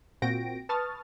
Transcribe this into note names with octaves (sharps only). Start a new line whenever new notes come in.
A#2 C4 F#4 G5 A#6 D7
B4 A5 C#6 D#6 F6 A6